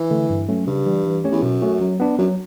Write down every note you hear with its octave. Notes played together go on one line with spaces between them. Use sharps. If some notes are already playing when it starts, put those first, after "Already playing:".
Already playing: E3
D3 A3
G2
F#3 A3 C#4
G2 C#3
E3 G3
E3
A3 C#4 G4 C#5
E2
F#2 B2
A3 C#4 F#4
F#3
B3 D4
F#2 F#3